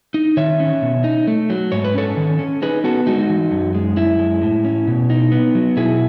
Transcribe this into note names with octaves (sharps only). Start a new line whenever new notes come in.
D#4
D#3 C#5 E5
C#4
B2
D#4
A3
F#3
G#2 C#5
B4
C#4 A4 C#5
D#3
C#4
D#4 G#4 B4
B3 F#4 A4
G#3 D#4 F#4
E3
F#2
G#3
F#2 E4
G#3
A2
C#4
B2
D#4
B3
F#3
B2 E4 G#4